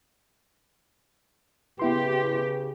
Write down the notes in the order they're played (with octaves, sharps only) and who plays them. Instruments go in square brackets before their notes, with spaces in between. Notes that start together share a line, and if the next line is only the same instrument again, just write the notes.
[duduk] C#3 [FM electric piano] B3 E4 C6 [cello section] G4 [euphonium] B4